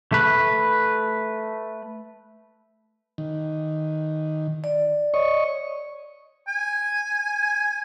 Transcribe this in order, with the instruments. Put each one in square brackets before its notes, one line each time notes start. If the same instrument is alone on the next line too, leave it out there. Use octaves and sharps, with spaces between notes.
[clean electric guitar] A3 B4
[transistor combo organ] D#3
[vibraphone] D5
[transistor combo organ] C#5 D#5 C#6
[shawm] G#5